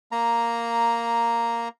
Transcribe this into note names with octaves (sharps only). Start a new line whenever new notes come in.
A#3 A#5